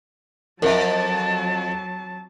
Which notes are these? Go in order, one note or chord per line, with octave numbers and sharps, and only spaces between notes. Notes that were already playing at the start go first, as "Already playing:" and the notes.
F2 F#3 A#4 E5 A5